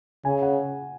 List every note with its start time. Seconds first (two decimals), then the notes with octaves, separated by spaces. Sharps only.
0.25 C#3 G#5
0.42 F#5